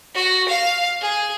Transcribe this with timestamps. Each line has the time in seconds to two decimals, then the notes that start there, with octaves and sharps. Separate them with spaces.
0.14 F#4
0.48 F5
1.01 G#4